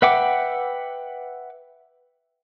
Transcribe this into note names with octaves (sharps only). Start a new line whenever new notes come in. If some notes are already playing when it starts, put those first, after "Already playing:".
B4 E5 F#5 G5 D6